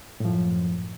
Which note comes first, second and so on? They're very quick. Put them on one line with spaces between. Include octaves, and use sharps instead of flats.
A2 F3 F#2